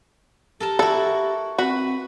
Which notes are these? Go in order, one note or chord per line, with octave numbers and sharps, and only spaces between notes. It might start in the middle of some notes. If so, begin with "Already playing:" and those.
G4 A4 A#4 A5
E4 F#4 A4
C4 F#4 B4